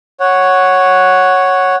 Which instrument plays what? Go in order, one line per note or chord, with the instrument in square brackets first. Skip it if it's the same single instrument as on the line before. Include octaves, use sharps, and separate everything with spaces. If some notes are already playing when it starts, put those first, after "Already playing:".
[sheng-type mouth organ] C#5 F#5